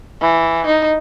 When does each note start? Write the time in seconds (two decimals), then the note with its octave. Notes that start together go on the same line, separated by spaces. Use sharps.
0.21 E3
0.66 D#4